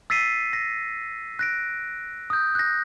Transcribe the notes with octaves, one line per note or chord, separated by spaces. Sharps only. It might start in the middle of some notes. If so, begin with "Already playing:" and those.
E6 A6 B6 C7 D#7
A#6
F#6 A#6 D7
D#6 G6
F#6 A#6